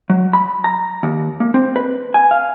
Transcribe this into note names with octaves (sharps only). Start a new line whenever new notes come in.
F#3
B5
A#5
D#2
A#3
C4
B4
G#5
F5